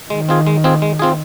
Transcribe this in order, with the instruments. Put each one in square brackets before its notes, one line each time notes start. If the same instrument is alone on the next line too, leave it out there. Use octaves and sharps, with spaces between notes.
[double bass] D#3 [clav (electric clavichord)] G#3
[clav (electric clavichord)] C4 F4 G#4
G#3
C4 F4 G#4
G#3
C4 F4 G#4